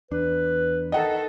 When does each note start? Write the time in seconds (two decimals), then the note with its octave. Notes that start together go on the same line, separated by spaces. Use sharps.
0.11 E2 D4 B4
0.92 D#3 A4 D#5 F#5 A5